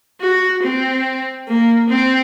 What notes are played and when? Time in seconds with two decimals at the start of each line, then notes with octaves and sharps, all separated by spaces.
0.20 F#4
0.62 C4
1.48 A#3
1.89 C4